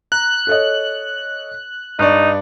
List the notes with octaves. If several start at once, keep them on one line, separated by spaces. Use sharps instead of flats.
A#5 F#6
A4 C#5 D#5
G2 D#4 D5 C#6 F#6